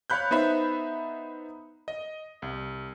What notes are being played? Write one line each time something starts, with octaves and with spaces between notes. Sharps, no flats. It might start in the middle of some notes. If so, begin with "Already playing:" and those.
C#5 F5 B5 F#6 G6
B3 D#4 C5 E5 B5
D#5
C2